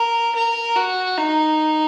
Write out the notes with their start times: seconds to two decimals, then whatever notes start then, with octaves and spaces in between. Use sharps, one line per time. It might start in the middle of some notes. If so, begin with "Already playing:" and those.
Already playing: A#4
0.35 A#4
0.76 F#4
1.17 D#4